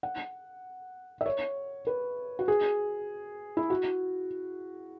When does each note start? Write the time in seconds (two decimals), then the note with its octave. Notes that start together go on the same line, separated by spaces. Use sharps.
0.03 F#5
1.21 E5
1.26 C#5
1.87 B4
2.39 F#4
2.48 G#4
3.57 E4
3.70 F#4